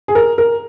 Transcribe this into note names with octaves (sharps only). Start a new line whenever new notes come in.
G#4
A#4
A#4